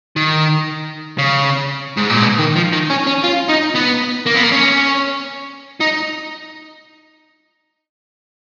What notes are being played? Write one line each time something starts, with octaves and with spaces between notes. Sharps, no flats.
D#3
C#3
G#2
A#2
B2
D#3
F3
D#3
C#4
C#4
F4
D#4
B3
A#3
B3
A#3
C#4
D#4